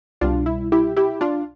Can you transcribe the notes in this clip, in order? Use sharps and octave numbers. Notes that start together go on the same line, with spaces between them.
C2 B2 G3 D4 F4
E4
E4 G4
E4 G4
D4 F4